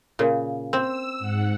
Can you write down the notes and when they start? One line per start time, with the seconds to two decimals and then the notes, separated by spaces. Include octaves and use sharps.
0.19 A#2 C#3
0.73 C4 E6
1.19 G#2 F#5